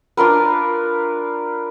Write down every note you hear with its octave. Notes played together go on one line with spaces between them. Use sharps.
D4 F4 A#4 B4